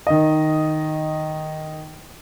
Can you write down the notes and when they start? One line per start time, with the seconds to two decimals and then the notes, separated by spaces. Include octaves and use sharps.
0.07 D#3 D#5